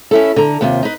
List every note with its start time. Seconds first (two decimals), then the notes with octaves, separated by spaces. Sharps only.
0.11 C#4 E4 A4
0.36 D3 A#5
0.61 D#2 C3 F4
0.83 D#4 B4